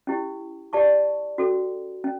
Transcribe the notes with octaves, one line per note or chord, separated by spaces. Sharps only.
C#4 E4 G4
G4 D5 A5 C#6
C#4 F#4 A4
C#4